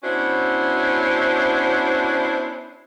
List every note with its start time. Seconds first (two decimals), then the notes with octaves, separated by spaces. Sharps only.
0.03 B3 C#4 D4 E4 F#4 C5